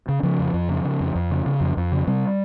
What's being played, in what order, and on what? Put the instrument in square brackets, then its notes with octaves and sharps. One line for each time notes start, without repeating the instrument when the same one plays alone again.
[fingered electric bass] C#3
C#3 F3
F2
F2
C#3
C#3
F2
F2
C#3
C#3
F2
F2
C#3
C3 G3